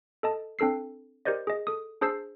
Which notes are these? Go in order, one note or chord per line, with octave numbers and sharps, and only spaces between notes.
A4 D#5 A5
C4 D4 A4 E6 C7
G4 A#4 C5 D5 D#5
G#4 D#5
A4 D#6
D4 G#4 C5 A5 E6 C7